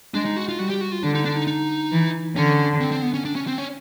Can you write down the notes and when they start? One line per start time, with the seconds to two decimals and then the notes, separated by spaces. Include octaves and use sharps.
0.14 G#3 D4
0.25 D#4
0.37 F#4
0.49 F4
0.59 G3 F#4
0.70 G4
0.81 F#4
0.92 F4
1.03 D3 D4
1.15 D#4
1.25 D4
1.36 D#4
1.47 D#4
1.92 E3
2.36 D3 C#4
2.81 C4
2.92 C4
3.02 B3
3.14 C#4
3.25 D4
3.35 C#4
3.47 C4
3.58 C#4